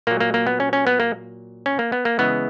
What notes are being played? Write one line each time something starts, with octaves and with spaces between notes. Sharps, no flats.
A#2 F#3 A#3
A#3
A#3
B3
C#4
C#4
B3
A#3
C#4
A#3
B3
A#3
C#3 E3 G#3 B3